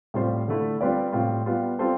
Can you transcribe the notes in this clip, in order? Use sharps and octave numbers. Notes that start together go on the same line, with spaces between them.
A2 G3 C4 F4 C5
D3 A3 E4
G3 C4 F4 B4 D5
A2 G3 C4 F4
G3 B3 F4
G3 C4 F4 A4 C5